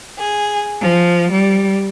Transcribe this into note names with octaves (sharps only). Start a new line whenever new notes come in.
G#4
F3
G3